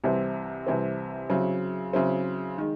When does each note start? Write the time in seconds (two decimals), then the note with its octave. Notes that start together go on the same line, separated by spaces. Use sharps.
0.04 C2 C3 E3 C4
0.67 C2 C3 E3 C4
1.29 C#3 F#3 C4 E4
1.93 C#3 F#3 C4 E4
2.58 D#3 G#3